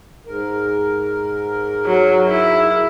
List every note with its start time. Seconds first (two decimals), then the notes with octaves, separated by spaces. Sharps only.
0.27 G#2 A#4
1.86 F#3
2.28 E4